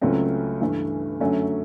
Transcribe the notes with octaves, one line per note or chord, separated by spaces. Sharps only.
C#2 C#3 F#3 A3 C4
G2 E3 A3
F#2 D3 F#3 A3 C#4